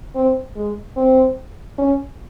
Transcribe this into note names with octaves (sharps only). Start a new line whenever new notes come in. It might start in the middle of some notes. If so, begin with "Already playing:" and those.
C4
G#3
C4
C#4